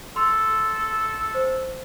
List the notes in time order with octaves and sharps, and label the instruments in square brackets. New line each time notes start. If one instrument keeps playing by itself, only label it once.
[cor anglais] A4 [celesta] C6 E6
[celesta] C5